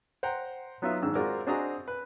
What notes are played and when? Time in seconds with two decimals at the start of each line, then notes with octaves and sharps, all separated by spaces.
0.23 C5 F#5 G5 A#5
0.82 F#3 B3 D#4 F4 B4 E5
1.02 G#2 D#3 D4 E6
1.15 G#3 C4 F4 F#4 A#4 D5
1.47 C4 D4 F#4 G#4 D#5 A#5
1.88 B4